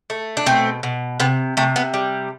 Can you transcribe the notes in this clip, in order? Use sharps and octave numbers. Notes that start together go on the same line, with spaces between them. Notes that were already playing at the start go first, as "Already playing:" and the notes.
A3
D4
B2 A3 C4
B2
C3 B3
C3 A3
B3
G3